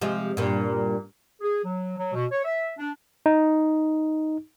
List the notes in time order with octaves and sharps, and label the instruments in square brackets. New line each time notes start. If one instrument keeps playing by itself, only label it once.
[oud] C3 F3 G#3
G2 A#2
[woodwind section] G#4
F#3
F#3
B2
C#5
E5
D4
[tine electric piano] D#4